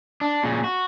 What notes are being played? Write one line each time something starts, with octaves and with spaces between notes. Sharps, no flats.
D4
A#2 C#3
F#4